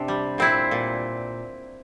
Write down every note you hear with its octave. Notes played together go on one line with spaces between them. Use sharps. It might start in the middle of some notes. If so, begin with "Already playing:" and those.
Already playing: C3 D4
G3
A#2 C4 E4
A#2